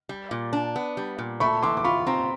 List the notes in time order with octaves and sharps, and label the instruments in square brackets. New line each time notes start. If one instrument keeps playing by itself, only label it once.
[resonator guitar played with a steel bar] G3
A#2
D4
B3
G3
A#2
[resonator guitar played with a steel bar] A3 [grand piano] B5 C#6
[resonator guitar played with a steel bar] E3 [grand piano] C6 D6
[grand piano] D6
[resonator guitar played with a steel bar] F4 [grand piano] B5 C#6
[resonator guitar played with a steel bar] C4 [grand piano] A#5 C6